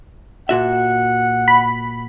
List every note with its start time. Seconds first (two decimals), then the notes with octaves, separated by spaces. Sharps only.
0.49 A#2 F#4 E5 F#5
1.48 B5